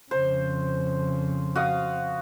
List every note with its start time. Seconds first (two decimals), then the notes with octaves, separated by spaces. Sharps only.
0.11 F2 C#3 C5
1.55 F#4 F5 D#6